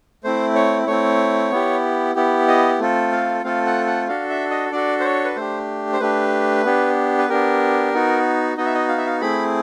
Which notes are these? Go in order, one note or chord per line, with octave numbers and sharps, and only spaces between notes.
A3 C4 E4 C5
C#5
A3 C4 E4 C#5
B3 E4 G4
B3 E4 G4
D#5
A3 C4 F4 A4
F5
A3 C4 F4 A4 F5
F#5
F#5
D4 F#4 A4 F5
E5
D#5
D4 F#4 A4 D5
C5
C#5
B4
A3 D4 G4 C5
C5
A3 D4 G4 B4
B3 D4 G4
B4
B3 D4 G4 A#4
B3 D#4 F#4
B3 D#4 F#4 D#5
E5
D#5
F5
E5
F5
A3 C4 E4 G#4 B5